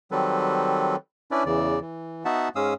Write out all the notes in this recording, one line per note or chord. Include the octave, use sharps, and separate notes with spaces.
D#3 F#3 G3 C4 A4 B4
C#4 D4 E4 B4 D5
E2 C#3 E3 D5
E3
B3 D#4 F#4 E5 F#5 A5
G#2 G#3 C#4 F5 D#6 E6